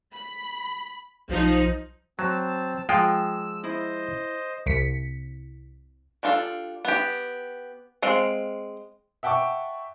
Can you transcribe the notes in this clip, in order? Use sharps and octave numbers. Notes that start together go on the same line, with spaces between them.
B5
B1 F3 D#4
F#3 C4 A5
F3 G#3 F4 G5 E6
E4 C5 D#5
C2 B6 C#7
G3 D4 F4 A4
B3 G4
G#3 C4 F5
E5 F#5 G5 A5 C#6 D6